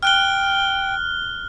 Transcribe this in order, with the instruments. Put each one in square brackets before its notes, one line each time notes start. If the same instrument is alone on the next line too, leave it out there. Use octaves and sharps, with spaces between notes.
[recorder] G5 [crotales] F6 F#6 G7